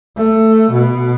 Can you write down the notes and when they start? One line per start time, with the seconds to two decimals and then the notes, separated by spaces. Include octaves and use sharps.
0.16 A3
0.71 B2